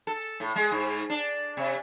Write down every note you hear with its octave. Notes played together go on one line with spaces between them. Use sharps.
A4
A2
G#3
G#2
D4
C3